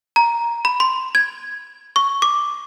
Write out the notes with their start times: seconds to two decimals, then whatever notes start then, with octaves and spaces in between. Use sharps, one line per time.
0.16 A#5
0.65 B5
0.80 C6
1.15 G#6
1.96 C#6
2.22 D6